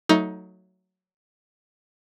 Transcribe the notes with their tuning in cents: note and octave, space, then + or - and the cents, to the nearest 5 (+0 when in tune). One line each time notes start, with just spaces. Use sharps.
F#3 +0 A3 +15 D#4 +20